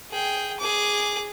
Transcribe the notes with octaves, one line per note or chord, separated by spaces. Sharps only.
G#4 G5
G#4 D6